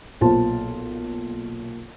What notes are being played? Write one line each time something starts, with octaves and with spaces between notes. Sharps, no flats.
B1 A#2 F4 C5 A5